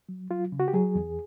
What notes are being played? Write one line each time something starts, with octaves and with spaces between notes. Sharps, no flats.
F#3
F#3 F4
C#3
F#4
G4
F#3 G#4
E2